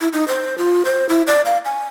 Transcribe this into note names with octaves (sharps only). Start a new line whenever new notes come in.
E4
D#4
C5
F4
C5
E4
D5
F5
G#5